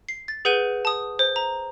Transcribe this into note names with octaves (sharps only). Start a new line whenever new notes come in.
C7
A6
G#4 B4 F#5 G6 D#7 G7
A5 D#6
C5
A#5